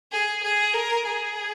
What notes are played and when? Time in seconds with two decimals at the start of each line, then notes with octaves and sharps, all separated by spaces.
0.12 G#4
0.44 G#4
0.74 A#4
1.06 G#4